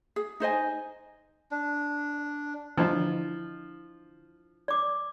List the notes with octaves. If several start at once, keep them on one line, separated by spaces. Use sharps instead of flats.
G#4
D#4 C5 D#5 G#5
D4
D3 E3 F3 D4 E4 D#5
D5 D6